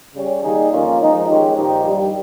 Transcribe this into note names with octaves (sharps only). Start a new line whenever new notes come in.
C#3 G3 C#4
D#3 G3 A#3 D#4 G#4
F2 D#3 A#3 C#4 F4
F3 G#3 D#4 G#4
D#3 G#3 C#4 G4
A#2 F3 A#3 D#4 G4
G2 D#3 G3